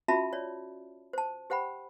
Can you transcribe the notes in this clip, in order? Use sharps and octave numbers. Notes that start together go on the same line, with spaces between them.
C#4 F4 F#4 E5 A5 B5
C#5 D5
C5 A5
G4 C5 F#5 G5 B5